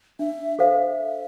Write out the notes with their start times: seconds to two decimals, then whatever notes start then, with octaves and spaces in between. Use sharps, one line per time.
0.19 D4 E5
0.59 A4 C5 E5 F5